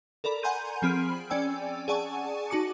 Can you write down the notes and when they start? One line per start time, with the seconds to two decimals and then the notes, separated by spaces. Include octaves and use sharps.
0.24 A4 A#4 D5 B5
0.43 F#5 G#5 A#5 C6 G6 D#7
0.82 F3 C4 G#4 B5 F6 D7
1.30 C#4 D5 G5 G#5 E6
1.88 G#4 D5 F#5 G#5 A5 C#6
2.50 D#4 F#4 A5 D6 C#7